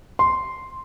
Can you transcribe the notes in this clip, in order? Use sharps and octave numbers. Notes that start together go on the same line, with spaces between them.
C6